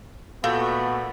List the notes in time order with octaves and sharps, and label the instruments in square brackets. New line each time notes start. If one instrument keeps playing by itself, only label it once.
[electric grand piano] A#2 F#4 G6 [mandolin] A3 [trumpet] B3 [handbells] F5